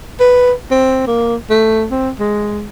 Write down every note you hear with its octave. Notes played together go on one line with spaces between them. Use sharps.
B4
C4
A#3
A3
C4
G#3